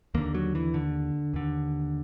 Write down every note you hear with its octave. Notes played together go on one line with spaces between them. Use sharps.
D#2 D3 A#3
F#3
E3
D3
D#2 D3